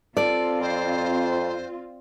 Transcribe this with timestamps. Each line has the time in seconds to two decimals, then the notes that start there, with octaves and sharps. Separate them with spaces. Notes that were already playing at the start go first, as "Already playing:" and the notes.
0.17 C4 F4 A4 D5
0.61 F2 C5